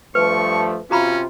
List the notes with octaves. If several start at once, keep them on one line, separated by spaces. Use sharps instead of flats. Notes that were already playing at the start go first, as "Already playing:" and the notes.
G2 F3 A3 B4 C#6
C3 C#4 F4 F#4 A#5 B5